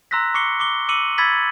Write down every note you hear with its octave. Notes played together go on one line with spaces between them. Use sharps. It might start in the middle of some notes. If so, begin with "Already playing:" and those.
A#5 C6 E6 F#6 A#6 B6
C#6 D6 C7 C#7 G7
D6 C#7 G7
D6 E6 C#7 D#7 F#7
B5 E6 G#6 A6 B6 F#7